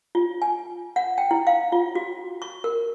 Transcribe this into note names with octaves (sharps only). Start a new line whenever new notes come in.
F4
G#5
F#5
G5
E4
F5
F4
F#4
C#6
A#4